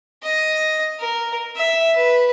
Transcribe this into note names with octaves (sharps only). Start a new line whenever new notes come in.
D#5
A#4
E5
B4